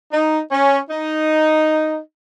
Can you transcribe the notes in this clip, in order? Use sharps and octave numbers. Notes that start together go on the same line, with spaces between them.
D#4
C#4
D#4